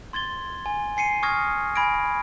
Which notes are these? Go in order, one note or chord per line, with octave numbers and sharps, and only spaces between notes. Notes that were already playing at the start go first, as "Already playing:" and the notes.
C6 G#6 A6 G7
G#5
G#5 C7 C#7 D#7
C#6 D#6 F6 G#6 A#6
G#5 B5 G#6 A#6 D7